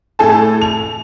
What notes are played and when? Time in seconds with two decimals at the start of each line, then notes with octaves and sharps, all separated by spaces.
0.19 A2 A3 G#4 A4 A5
0.61 F7